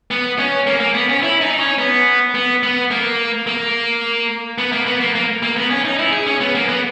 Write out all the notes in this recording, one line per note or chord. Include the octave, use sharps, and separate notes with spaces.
B3
C#4
A#3
A#3
B3
C#4
E4
D#4
D#4
C#4
B3
B3
B3
A#3
A#3
B3
A#3
B3
A#3
A#3
A#3
B3
C#4
D#4
E4
G#4
C#4
B3
A#3
B3